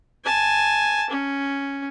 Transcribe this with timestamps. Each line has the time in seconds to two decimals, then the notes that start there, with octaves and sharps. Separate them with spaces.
0.24 G#5 A5
1.10 C#4